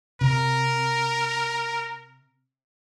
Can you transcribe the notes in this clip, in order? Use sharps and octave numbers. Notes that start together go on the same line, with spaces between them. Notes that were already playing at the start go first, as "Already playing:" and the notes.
C3 A#4